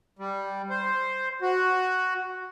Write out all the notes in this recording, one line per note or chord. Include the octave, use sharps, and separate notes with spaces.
G3
C5
F#4